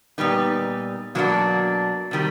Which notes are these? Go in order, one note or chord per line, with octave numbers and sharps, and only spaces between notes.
A#2 G3 B3 D#4
B2 F#3 A#3 D4
C3 D#3 G3